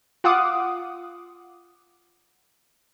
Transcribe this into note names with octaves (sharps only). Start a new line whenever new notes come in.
F4 F5 F#5 D6 D#6